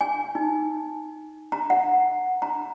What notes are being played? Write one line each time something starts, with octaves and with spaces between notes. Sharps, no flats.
G#5
D#4
A#5
F#5
A#5